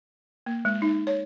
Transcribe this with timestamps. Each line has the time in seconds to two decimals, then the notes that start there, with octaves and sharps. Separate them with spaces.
0.46 A#3
0.65 G#3
0.82 D#4
1.07 C#5